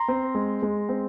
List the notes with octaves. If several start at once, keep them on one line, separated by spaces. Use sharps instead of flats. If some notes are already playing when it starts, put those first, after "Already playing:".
Already playing: A#5 C6
C4
G#3
G#3
C4